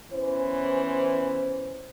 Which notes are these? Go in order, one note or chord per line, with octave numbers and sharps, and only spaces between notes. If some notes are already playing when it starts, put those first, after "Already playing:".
E2 E3 C#4 C5